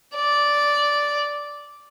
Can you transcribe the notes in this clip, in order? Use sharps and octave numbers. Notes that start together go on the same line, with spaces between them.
D5